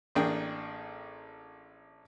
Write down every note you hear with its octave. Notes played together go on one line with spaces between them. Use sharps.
A1 A#3 D4 G#4 G5